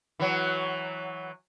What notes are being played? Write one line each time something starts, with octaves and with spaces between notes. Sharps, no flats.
E3 F#3